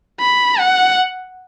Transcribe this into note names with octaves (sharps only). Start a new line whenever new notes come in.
B5
F#5